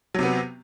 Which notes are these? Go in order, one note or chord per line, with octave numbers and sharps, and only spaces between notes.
C3 F#3 B3